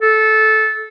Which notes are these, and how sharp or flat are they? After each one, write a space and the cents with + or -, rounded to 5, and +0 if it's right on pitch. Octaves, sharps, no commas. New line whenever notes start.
A4 -15